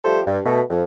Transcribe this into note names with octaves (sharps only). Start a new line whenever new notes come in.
F3 G3 A3 G4 A4 C5
G2
B2 A3
F2